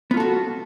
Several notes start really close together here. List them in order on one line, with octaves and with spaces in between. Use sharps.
B3 F4 A4 F#4